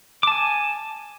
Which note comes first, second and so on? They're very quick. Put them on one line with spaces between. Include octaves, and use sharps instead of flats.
D6 A5 G#5